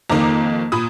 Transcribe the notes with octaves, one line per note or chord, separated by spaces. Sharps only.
F2 D#3 A#3 A#5 D6
A#2 B5 D#6